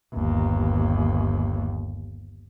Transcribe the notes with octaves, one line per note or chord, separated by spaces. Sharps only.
G1 D#2